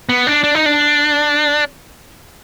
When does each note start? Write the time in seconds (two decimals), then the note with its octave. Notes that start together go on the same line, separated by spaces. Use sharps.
0.09 B3
0.27 D4
0.44 D4
0.55 D#4
0.66 D4